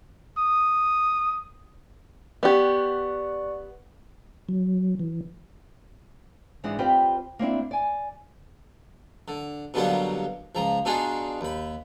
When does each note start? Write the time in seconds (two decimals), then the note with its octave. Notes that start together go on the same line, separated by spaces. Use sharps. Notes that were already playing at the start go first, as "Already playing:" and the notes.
0.38 D#6
2.43 B3 G4 D5 F#5 C#6
4.49 F#3
5.00 E3
6.63 G#2 E3 G#3 B3 D4 F#5
6.79 C4 F4 G4 B4 D5 G5
7.39 A#3 C4 D4 E4
7.71 D5 G#5
9.28 D3
9.74 B2 D3 F#3 G3 A#3 B3
10.55 C#2 F3 A#5
10.85 B2 D4 D#4 F4 G#4
11.41 D#2 B5